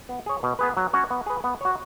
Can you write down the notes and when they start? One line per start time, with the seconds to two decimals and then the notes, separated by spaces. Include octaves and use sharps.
0.09 B3
0.26 G#4 C#5
0.43 B2
0.59 B3 G#4 B4
0.77 F#3
0.93 C#4 F#4 C#5
1.11 B3
1.26 G#4 B4
1.44 B3
1.61 F#4 C#5